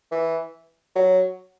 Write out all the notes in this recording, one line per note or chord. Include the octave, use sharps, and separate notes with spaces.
E3
F#3